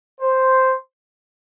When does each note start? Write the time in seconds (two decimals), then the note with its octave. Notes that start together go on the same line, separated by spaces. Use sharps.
0.20 C5